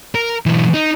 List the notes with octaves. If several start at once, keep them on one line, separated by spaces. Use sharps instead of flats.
A#4
B1 E3
D#4